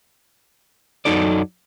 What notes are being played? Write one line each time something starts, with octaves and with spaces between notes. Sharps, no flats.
F#2 F#3 D#4 A4 D5